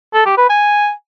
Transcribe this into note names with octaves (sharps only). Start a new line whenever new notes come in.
A4
G4
B4
G#5